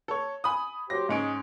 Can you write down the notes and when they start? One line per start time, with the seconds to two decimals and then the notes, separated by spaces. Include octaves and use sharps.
0.08 A4 C#5
0.44 G#5 B5 D#6
0.90 F#3 G4 C5 A#6
1.09 G#2 G#3 C#4 D7